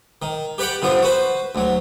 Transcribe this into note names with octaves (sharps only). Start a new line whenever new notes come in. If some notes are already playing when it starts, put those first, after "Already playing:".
D#3
G4 B4 D5 F#5 G5
G2 D3 F3 B3
F#4 B4 C5
D2 F#3